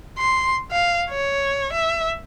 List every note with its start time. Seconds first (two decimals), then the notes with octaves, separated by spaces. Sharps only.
0.18 C6
0.72 F5
1.10 C#5
1.73 E5